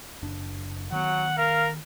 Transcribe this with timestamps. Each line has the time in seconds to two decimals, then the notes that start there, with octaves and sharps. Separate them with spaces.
0.23 F#1 D4
0.92 D#3 F#3 B3 F#5
1.38 A#4 F5